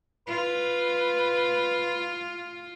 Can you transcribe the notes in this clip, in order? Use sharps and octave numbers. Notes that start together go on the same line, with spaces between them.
F4 B4